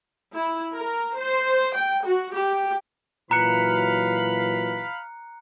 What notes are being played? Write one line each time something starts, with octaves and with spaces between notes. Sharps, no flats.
E4
A#4
C5
G5
F#4
G4
A#2 E3 F#3 F5 A#5 B5 F#6 C#7